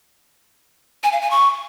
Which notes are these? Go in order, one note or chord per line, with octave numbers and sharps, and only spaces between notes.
G#5
F5
G#5
C#6